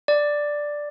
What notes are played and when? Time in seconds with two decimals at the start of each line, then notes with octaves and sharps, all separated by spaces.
0.08 D5